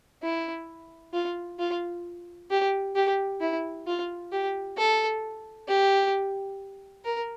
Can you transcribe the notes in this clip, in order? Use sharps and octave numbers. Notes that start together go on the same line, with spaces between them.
E4
F4
F4
G4
G4
E4
F4
G4
A4
G4
A#4